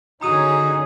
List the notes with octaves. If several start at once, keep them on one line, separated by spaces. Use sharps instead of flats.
D3 C#4 D#4 F#4 G#4 A#5 D#6 D#7